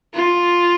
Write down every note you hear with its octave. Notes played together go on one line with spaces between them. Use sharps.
F4